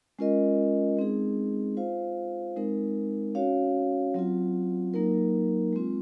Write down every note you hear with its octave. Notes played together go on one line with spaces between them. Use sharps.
G#3 C#4 F4 A#4 D#5
G#3 C4 D#4 G#4
F4 C5 F5
G#3 C4 D#4 A#4
C#4 F#4 C#5 F5
F#3 C4 F4
F#3 A#3 D#4 A#4
G#3 C4 F4